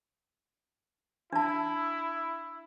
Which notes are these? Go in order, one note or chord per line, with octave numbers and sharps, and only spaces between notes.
D4 E4 A5